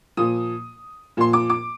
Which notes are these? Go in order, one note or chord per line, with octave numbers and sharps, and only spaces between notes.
A#2 F3 D#6
A#2 F3 C6
D6
D6